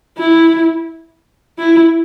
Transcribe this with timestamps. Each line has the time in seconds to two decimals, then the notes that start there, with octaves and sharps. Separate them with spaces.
0.18 E4
1.58 E4